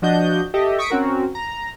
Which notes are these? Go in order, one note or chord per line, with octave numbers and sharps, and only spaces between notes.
F3 D4 F#4 D#5 G6
G4 A4 D#5 E5
C#6 D#6 B6 C#7 D7
C4 C#4 F#4 A#4
A#5